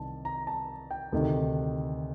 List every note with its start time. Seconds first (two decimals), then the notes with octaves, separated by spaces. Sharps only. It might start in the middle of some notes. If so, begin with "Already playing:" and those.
Already playing: C2 C3 D#3 A5
0.25 A#5
0.47 A5
0.91 G5
1.12 D2 C3 D#3